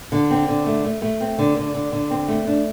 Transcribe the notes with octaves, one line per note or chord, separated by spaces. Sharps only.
D3
C4
D3
A3
A3
A3
C4
D3
D3
D3
D3
C4
A3
D4